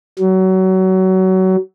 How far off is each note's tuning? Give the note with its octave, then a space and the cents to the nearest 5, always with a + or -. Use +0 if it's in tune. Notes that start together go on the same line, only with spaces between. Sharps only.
F#3 +25